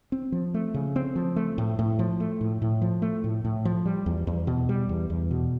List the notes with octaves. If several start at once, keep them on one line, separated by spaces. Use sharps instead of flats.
C4
F3
A3
C#3
C4
F3
A3
A2
A2
F3
A3
A2
A2
F3
A3
A2
A2
F3
G3
E2
E2
B2
G3
E2
E2
B2